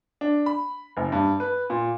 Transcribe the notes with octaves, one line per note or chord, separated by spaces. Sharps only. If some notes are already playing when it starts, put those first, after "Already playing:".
D4
B5
F#1
G2
B4
A#2